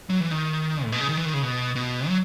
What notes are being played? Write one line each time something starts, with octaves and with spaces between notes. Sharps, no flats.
F#3
E3
D#3
A2
B2
C#3
D#3
E3
D#3
C#3
B2
B2
F#3